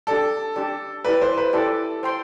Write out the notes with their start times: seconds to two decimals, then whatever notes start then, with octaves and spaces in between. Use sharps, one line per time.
0.07 D4 G4 A4 D5 A5
0.56 D4 G4 D5 A5
1.04 E4 G4 B4 D5
1.21 C5
1.37 B4
1.53 E4 G4 A4 D5
2.03 C5 G5 C6